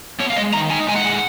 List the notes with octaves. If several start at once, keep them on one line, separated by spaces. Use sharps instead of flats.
B3 C#5
F5
G#3 D#5
D#3 A#5
D#4 G#5
G#3 G#5
F#5
G#3